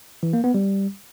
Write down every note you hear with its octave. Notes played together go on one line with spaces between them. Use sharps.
E3
A#3
B3
G3